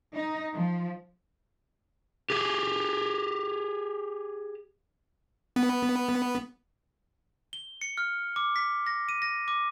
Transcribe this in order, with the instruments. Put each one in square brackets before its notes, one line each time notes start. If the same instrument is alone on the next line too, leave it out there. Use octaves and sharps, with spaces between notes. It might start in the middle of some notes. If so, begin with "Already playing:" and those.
[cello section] D#4
F3
[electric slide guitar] G4 G#4
[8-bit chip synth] B3
[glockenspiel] G7
C#7
F6
D6
B6
A#6
D#7
A#6
D6